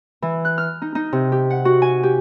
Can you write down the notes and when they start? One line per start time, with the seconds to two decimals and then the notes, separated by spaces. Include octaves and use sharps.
0.22 E3
0.45 F#6
0.58 F6
0.82 D#4
0.95 D#4
1.13 C3
1.32 G4
1.50 F#5
1.65 F#4
1.82 G#5
2.03 G4